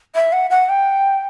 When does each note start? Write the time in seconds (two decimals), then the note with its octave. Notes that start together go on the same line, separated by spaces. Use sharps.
0.15 E5
0.33 F#5
0.50 F#5
0.69 G5